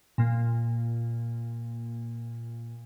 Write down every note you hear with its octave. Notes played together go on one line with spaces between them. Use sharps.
A#2 A#3